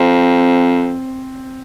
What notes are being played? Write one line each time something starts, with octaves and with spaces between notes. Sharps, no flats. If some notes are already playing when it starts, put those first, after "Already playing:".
Already playing: F2 C4